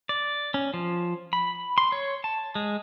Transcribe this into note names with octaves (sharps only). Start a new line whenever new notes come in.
D5
C#4
F3
B5
C6
C#5
A5
G#3